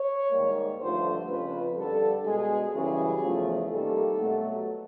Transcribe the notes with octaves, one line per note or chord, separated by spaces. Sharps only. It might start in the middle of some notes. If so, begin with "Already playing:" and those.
Already playing: C#5
G#2 D#3 G3 A#3
G2 D3 F3 A3 C5
F2 C#3 F3 B4
G2 D3 G3 A4
B2 G#3 G#4
F#2 C#3 E3 G3 G#4
E2 C#3 F3 A3
C3 D#3 G3 A#3 A4
B2 F#3 A3